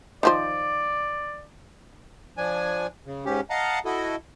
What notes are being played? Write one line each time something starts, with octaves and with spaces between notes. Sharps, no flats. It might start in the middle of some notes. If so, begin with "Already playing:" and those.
D#3 F3 C5 D5
F3 D4 G#5
C#3
G#2 C#4 G4
D#5 F5 F#5 A5 A#5
E4 F#4 A4 D#5